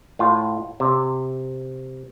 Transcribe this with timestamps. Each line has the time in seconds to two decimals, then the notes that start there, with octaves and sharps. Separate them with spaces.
0.19 A2 F4
0.80 C3